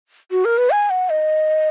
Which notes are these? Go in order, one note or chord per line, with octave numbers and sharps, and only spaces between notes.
F#4
A#4
B4
G#5
F#5
D#5